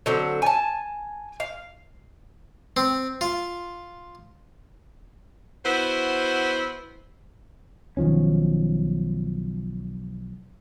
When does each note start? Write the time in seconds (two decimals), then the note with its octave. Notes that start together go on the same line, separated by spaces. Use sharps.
0.06 D3 F#3 C4
0.42 G#5 A5
1.40 F5
2.77 C4
3.21 F4
5.66 B3 E4 F#4 C5
7.97 B1 D#3 F3 C#4